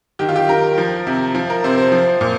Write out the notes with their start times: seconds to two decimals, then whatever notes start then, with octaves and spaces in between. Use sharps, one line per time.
0.19 D#3 G4
0.29 F4
0.36 G4
0.48 D#3 A#4
0.78 F3
1.07 C3
1.35 F3
1.50 A#4
1.64 C3 C5
1.78 C5
1.92 F3
2.21 A#2